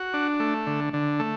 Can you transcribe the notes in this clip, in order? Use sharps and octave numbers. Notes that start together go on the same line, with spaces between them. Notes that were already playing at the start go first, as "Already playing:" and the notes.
Already playing: F#4
D4
A3
D3
D3
A3